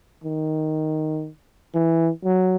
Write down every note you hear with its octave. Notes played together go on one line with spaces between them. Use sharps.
D#3
E3
F#3